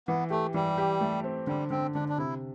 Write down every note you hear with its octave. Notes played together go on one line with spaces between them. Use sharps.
E3 B3
A3 G4
E3 G3
G4
A3
C4
D3 G3
D3 C4
D3 D4
D4
C3 E4